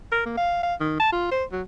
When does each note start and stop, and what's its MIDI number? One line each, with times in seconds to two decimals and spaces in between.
0.12 0.23 70
0.26 0.36 58
0.38 0.58 77
0.63 0.74 77
0.80 0.95 51
1.00 1.12 81
1.12 1.29 65
1.31 1.44 72
1.52 1.62 54